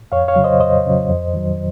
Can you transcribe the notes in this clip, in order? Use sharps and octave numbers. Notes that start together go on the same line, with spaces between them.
F2 C#5 F5
C#5 F5
C#3 F#3
C5 D#5
F2 C5 D#5
C#3 F#3
F2
D#3 F#3